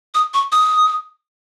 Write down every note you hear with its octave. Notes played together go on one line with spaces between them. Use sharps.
D#6
C#6
D#6